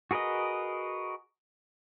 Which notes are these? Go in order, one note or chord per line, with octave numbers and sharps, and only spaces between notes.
F#4 G#4 A#4 B4 D#5